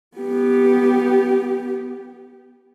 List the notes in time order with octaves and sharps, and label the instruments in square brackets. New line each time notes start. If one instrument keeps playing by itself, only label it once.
[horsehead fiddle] B3 G4